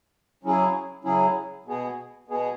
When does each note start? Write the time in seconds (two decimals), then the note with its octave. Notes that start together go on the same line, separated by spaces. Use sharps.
0.43 C#3 F#3 C#4 E4 G#4
1.04 C#3 F#3 C#4 E4 G#4
1.66 B2 B3 G#4
2.28 B2 B3 G#4